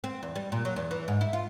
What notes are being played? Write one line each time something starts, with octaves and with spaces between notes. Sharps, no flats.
C4
E2
G3
A#2
F#3
E2
E3
G#2
E4
F4